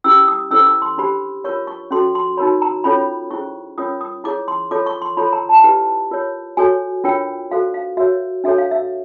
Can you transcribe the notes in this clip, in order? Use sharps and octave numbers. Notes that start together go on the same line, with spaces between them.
C#4 E4 G4 E6
D#6
C#4 E4 A4 C5 E6
D6
C6
D4 G4 C5 B5
F4 A#4 C#5 C#6
C#6
C#4 F#4 A4 C6
C6
D#4 F#4 A#4 C#5 B5
A#5
C#4 F4 A4 C#5 B5
C#4 E4 G#4 C5 C#6
C#4 F4 A#4 C#5 D#6
D#6
E4 G#4 C#5 D6
C6
F4 A4 C#5 D6
C#6
C6
F4 A4 C#5 B5
A#5
A5
E4 G4 B4
F4 A#4 C#5
F#4 A4 C#5 G#5
D4 F4 A#4 C#5 G5
F#4 A4 C5 F5
F5
F#4 A#4 C#5 E5
D4 F#4 A4 C#5 E5
F5
E5